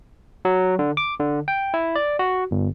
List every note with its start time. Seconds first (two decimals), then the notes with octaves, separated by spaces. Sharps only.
0.45 F#3
0.79 D3
0.97 D6
1.20 D3
1.48 G5
1.74 E4
1.96 D5
2.19 F#4
2.51 G1